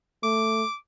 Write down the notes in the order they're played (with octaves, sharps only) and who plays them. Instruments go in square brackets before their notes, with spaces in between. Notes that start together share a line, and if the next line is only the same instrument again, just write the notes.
[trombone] A3 [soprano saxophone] D6